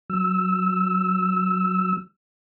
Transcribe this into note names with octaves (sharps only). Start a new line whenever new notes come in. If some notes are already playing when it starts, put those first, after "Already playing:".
F#3 E6